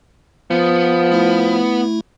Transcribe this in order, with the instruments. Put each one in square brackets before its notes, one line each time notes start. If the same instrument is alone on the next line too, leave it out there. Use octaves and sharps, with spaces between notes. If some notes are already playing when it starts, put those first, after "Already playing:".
[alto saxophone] F3 [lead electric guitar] B3
[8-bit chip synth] A3 E4